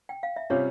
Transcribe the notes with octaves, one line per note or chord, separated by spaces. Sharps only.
G5
F5
E5
C3 G3 C#4 F4 C#5